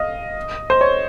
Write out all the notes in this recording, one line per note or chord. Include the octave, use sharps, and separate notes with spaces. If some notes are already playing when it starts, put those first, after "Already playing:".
Already playing: D#5 F5
C5
C#5